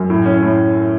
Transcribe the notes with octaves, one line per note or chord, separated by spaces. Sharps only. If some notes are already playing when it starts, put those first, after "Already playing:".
Already playing: F#2
A2
C#4
A2